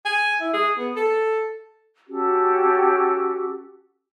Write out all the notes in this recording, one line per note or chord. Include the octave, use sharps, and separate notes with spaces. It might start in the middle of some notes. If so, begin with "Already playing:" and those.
G#5
E4
G#4
B3
A4
C#4 F#4 G4 A4